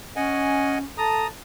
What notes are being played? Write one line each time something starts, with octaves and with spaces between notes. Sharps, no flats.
C#4 D#5 F#5 G#5
A4 A5 A#5 D#6